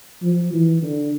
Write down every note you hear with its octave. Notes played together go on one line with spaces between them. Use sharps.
F3
E3
D3